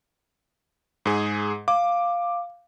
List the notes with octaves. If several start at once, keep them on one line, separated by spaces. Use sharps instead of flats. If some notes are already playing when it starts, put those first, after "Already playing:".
G#2 G#4
F5 D6